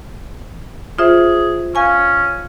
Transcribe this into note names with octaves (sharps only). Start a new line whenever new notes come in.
F4 G#4 C5 E5
C#4 F5 G#5 C#6